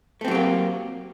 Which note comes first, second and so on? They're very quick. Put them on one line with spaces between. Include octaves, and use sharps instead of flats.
A3 C4 F#3 G4 A#3